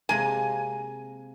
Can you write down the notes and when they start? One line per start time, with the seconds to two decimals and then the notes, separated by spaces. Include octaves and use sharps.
0.09 C3 G#3 A#3 G#5